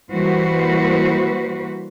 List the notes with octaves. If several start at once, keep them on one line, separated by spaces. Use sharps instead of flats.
E3 G3 A#3 F#4 B4 C5